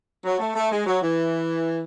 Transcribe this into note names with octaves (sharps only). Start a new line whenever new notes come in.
F#3
A3
A3
G#3
F#3
E3